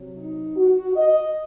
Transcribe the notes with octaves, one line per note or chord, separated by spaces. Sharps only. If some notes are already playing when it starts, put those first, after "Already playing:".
Already playing: C3 F#3
D#4
F#4
D#5